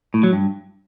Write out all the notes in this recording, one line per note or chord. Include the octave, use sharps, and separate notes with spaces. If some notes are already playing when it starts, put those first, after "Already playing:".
A2
F#3
G2